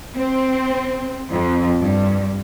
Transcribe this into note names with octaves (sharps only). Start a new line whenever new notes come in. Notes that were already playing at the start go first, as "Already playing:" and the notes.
C4
F2
G2